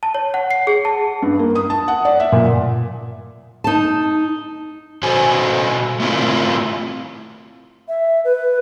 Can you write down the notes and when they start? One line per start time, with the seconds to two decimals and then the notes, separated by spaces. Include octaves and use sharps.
0.03 A5
0.15 C#5
0.34 F#5
0.51 C7
0.67 G#4
0.85 A5
1.22 G2
1.39 A#3
1.55 D#6
1.70 A5
1.88 F#5
2.05 D5
2.20 E5
2.32 A#2
3.64 D#4 A5
5.03 B2 F#4 A4 C5 G#5
6.00 A3 C4 E4 F4 A#4
7.88 E5
8.24 B4